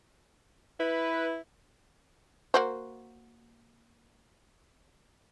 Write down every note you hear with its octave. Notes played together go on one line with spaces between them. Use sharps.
E4 B4
A#3 F#4 C5